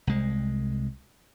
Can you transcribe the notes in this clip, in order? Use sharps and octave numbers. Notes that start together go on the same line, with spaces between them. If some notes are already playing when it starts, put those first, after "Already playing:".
C2 G#3